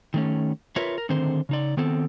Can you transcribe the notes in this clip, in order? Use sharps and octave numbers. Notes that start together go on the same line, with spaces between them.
D#3 A3 C#4
F4 A#4 B4 C#5 E5
A#4
D3 D#3 A3 C4 C5
C#3 D#4 D5
D#3 B3 C4 A4